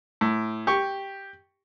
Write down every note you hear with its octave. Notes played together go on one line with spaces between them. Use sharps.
A2
G4 C#6